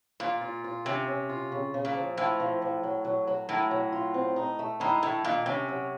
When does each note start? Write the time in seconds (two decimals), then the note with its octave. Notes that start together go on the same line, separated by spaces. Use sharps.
0.20 A#2 F4
0.41 F4
0.64 F4
0.85 C3 C#4
1.08 C#4
1.29 F4
1.52 C#3
1.74 C#3
1.85 A#2
1.95 F3
2.17 A2 F3
2.40 F3
2.62 F3
2.83 F#3
3.04 F#3
3.27 F#3
3.49 A2 A#4
3.71 F#3
3.92 F4
4.14 C4
4.36 D#4
4.59 A3
4.80 A2 D#4
5.03 A2 A3
5.24 A#2 D#3
5.46 C3 C#4
5.68 F#3